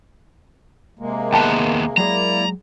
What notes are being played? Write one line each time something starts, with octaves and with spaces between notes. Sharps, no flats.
C3 G#3 A#3
D#2 B3 G5 A5
F#3 G#3 A#3 E4 G#4 D5 A#5